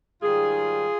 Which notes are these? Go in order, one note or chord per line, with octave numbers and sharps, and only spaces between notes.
G#2 D#3 G3 F4 G#4